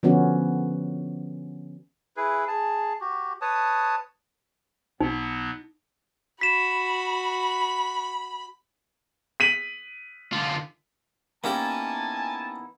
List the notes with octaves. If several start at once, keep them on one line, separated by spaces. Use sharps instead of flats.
D3 F3 B3 C#4 F#4
E4 G#4 B4
G#4 A5
F#4 G4
B4 C#5 A5 D#6
B1 B2 F#3 B3 D#4
F#4 B5 B6 E7
B6 D#7 F#7
D3 F4
A#3 B3 C#4 D#4 E4 G4 G#5 A5